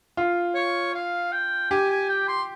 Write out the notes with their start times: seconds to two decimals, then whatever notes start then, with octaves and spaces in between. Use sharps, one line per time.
0.17 F4
0.55 C#5
0.95 F5
1.32 G5
1.71 G4 G#5
1.91 G#5
2.09 G5
2.28 C6